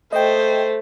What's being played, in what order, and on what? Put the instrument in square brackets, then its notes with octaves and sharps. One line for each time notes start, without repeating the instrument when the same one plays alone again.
[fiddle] A3 [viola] C5 [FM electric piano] D#5 G5